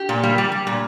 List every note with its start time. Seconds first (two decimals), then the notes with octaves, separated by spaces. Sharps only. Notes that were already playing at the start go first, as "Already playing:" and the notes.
Already playing: G4
0.09 A#2
0.23 G3
0.38 G3
0.52 G3
0.67 A#2